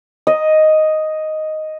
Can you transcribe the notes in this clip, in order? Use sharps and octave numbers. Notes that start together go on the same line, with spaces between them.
D#5